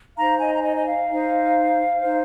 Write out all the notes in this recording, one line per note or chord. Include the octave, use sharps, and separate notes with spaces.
D#4 C5 F5 A#5
D#5 G#5
A#5
D#5 G#5
D#5
F5
D#4 C5
D#4 C5